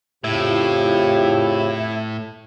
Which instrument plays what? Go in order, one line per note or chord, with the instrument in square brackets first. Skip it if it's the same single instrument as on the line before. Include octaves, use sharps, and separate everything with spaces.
[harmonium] F2 C#3 [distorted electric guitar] A2 [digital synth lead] E4 [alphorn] G4